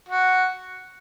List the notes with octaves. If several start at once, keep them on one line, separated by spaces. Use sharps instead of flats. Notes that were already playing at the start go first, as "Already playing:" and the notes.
F#4